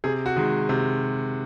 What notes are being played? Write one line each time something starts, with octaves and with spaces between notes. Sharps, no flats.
C3 G#4
F#4
D#3 G#3
C3